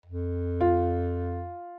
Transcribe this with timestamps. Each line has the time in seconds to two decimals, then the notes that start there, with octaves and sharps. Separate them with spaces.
0.06 F2
0.61 F4